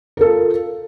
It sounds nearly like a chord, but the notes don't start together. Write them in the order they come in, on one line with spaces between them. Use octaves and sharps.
A#4 A4 F4